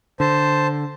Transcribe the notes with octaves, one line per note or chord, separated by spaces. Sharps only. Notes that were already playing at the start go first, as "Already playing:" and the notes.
D3 C5 A5